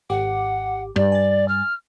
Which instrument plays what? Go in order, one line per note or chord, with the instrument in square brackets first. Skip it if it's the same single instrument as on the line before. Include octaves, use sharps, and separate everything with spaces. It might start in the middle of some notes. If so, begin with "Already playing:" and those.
[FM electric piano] G#1 G4 D6 [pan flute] F#5
[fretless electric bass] G2 [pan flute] D5
[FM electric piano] G#5 A6
[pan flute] F6